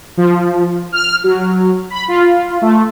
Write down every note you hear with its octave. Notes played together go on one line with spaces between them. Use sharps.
F3
F6
F#3
B5
F4
A3